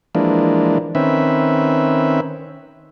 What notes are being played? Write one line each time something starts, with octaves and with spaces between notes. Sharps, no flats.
E3 F3 G#3 A#3 D4
D#3 C4 C#4 B4 E5